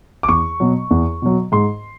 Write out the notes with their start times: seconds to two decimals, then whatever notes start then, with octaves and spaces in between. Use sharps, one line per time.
0.23 D6
0.28 E2 C#6
0.60 B2 F#3
0.91 E2
1.22 B2 F#3
1.52 G#2 C6